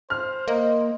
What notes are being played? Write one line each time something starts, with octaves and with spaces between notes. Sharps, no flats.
C5 F6
A#3 D#5